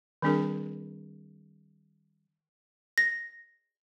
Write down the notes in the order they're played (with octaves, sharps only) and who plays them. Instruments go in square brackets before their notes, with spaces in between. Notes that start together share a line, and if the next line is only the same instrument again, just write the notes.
[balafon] D#3 G3 C4 D4 G#4 A#4
[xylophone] A#6